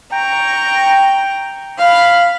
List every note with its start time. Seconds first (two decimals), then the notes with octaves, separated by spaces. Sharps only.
0.12 G5 A#5 C#6
1.78 F5 B5